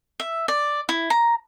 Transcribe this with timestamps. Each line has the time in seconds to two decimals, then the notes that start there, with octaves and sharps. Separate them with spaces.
0.20 E5
0.48 D5
0.89 E4
1.10 A#5